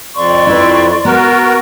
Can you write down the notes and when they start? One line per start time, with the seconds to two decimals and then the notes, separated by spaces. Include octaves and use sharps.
0.16 F2 D5 C6 C#6
0.47 E4 B4
1.05 B3 F#4 A#4